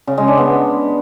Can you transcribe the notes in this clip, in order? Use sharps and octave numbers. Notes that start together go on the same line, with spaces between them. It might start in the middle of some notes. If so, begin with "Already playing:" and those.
C#3
G#3
D4
B3